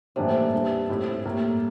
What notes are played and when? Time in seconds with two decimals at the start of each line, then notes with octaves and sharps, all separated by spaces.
0.16 A2 C3 E3 G3 A#3 D4
0.53 E2 E3 G3 D4
0.89 A2 G3 C4 E4
1.25 A2 G3 A#3